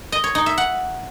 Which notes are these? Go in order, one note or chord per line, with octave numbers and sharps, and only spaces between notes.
D#5
C#5
D#4
E5
F#5